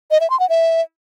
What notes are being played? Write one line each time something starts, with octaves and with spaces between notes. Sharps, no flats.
D#5
E5
C6
F#5
E5